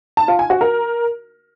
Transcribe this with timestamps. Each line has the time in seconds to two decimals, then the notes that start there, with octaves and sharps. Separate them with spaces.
0.17 A5
0.28 F4
0.39 G#5
0.50 F#4
0.61 A#4